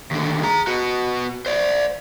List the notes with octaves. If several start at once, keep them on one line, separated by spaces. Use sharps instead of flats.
D#2 D3
G#4 A#5
B3 F#4
C5 D5